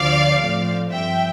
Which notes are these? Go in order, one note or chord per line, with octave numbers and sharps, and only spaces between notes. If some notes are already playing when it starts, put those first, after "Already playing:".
Already playing: D2 D3 F3 D5 F5
A2 F3 A3 C4
G2 F3 C4 E5 G5